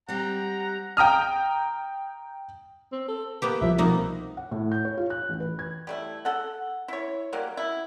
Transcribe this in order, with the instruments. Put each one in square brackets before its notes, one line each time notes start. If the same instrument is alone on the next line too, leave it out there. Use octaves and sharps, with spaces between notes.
[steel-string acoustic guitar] G3 C4 [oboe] F#5 [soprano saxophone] A#5
[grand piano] G5 A#5 D#6 F6
[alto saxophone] C4
A4
[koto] A#3 B3 G4 [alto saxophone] B4
[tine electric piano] C2 F3 [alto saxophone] E5
[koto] B2 A#3 D#4 [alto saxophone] C4
[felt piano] F#5
A2
G6
C#5
F4
F#6
A1
B4
G#6
[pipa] G3 A3 E4
A4 F#5
E4 C#5
F#3 G3 A#3
E4